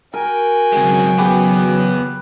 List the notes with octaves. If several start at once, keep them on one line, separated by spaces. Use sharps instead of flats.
F#4 A#4 G5 G#5
C#3 F#3 G#3 C4
B3 G4 G#4 B4